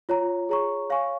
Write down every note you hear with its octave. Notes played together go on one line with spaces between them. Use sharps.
F4 C#5 A#5
G#4 C#5 A#5 C#6
C#5 F5 G#5 C#6